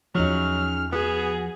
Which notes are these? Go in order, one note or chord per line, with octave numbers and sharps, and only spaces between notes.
E2 F3 F#3 C#4 D#4 G#4 F6
B3 F#4 G#4